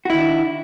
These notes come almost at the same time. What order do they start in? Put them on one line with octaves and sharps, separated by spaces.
F#4 E4 D#3 D4